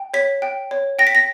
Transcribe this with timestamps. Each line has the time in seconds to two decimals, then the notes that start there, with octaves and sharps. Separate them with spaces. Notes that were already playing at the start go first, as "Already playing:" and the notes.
Already playing: G5
0.14 C#5 B6
0.42 G5
0.71 C#5
0.99 G5 A#6
1.07 B6
1.15 A#6